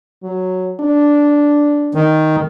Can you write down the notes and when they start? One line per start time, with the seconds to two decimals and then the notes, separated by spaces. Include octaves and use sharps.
0.23 F#3
0.80 D4
1.95 D#3